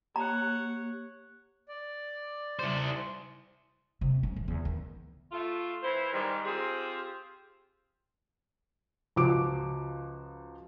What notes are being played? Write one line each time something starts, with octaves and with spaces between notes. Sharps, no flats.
A#3 G4 C#5 F#5 A#5
D5
E4 C5
C3
C#4
D2
E2
D#3
A3 F4
E3 E4 C5
G#2 D#3 G3
C4 F4 G4 G#4
C#2 F3 F#4 D6 D7